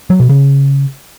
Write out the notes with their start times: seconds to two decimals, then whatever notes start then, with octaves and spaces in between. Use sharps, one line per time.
0.10 F#3
0.20 B2
0.29 C#3